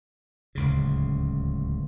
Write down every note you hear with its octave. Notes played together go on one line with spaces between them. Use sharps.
D1 C#2 C#3